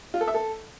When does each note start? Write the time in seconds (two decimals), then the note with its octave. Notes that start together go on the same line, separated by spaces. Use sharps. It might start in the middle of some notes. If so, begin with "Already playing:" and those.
0.14 F4
0.21 A4
0.28 E5
0.34 A4